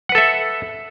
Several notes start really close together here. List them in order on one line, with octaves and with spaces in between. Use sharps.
F#5 B4 A4 E5